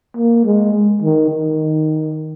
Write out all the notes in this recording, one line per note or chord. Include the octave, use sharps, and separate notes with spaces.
A#3
G#3
D#3
D#3